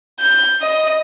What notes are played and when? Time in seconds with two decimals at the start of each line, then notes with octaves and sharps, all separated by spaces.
0.20 G6
0.62 D#5